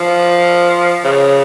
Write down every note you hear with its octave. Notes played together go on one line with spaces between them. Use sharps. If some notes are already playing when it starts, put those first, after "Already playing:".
Already playing: F3
C#3